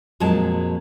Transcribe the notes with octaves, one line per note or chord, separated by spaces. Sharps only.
F2 A#2 F#3 G#3 A5